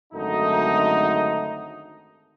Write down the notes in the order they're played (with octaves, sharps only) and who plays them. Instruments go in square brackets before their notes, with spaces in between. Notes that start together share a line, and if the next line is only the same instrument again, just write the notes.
[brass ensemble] G#1 F#2 D3 A3 D#4